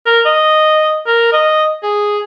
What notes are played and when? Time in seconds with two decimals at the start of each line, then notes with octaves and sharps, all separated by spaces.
0.06 A#4
0.25 D#5
1.07 A#4
1.33 D#5
1.83 G#4